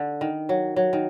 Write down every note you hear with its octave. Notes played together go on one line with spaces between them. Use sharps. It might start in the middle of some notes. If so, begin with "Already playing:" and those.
Already playing: D3
D#3
F#3
F#3
D#3